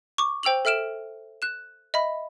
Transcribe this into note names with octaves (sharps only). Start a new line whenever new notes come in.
C#6 D6
C5 G5 E6 F7 F#7
A4 E5 F6 D7 E7
F#6 E7
D#5 E5 B5